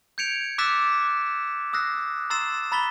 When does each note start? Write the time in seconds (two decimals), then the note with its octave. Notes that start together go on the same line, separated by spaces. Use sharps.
0.18 G6 G#6 C#7 D7 F7
0.58 D6 E6 F#6 A6 B6 E7
1.73 D#6 E6 F#6 A#6 C7
2.30 A#5 C6 E6 A6 C7 E7
2.72 A#5 B5 A6 B6 G7